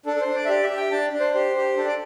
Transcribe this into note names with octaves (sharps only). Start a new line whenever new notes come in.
D4 A4
A4
C5
D4
D5
E5
G4 D5
E5
G4
G5
D4 A5
D4
C5
G4 C5
G4
D4 A4
D5